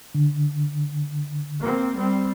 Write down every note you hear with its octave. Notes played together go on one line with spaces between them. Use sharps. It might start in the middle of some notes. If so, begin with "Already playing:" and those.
D3
A#3 C4
G3 C4